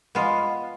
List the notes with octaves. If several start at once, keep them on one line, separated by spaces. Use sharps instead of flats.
G#3 B3 F4